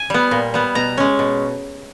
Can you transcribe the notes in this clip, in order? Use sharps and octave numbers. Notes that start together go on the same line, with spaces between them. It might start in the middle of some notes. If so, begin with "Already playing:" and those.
Already playing: G#5
G3 B3
A#2
G3 B3
B2 A#5
G#3 C#4
B2